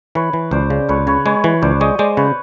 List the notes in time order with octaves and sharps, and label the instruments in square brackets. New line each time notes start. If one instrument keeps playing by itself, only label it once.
[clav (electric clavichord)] E3 [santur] B4 C#5
[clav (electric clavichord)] E3
[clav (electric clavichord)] C#2 [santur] C5 D5
[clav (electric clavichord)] C#3
[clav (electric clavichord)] C#2 [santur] B4 C#5
[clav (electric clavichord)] C#3 [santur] B4 C#5
[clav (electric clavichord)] G#3 [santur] B4 C#5
[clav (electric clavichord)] E3 [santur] B4 C#5
[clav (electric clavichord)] C#2 [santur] C5 D5
[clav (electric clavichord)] G#3 [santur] C#5 D#5
[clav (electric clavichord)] G#3 [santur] C5 D5
[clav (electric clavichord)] C#3 [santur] B4 C#5